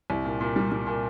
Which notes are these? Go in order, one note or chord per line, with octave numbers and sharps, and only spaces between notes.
C2
A#2
A#2
G3
G3
A#2